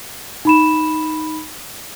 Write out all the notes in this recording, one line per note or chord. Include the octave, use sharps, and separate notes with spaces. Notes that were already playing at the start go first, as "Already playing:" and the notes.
D#4 B5 E7